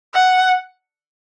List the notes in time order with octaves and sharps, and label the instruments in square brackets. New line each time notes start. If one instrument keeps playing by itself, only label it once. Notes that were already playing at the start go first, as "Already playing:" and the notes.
[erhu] F#5